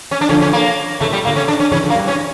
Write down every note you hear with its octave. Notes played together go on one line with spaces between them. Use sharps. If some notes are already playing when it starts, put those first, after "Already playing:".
C#4
D4
D3 F3 C#4
C#4
A#3
C#3 E3 A3
A#2 D3
G3
A#2 D3 A#3
C#4
D4
C#4
C#3 E3 C#4
D3 F3
A#3
E3 G3
C#4